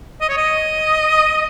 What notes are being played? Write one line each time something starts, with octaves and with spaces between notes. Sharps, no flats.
D#5
C#5
D#5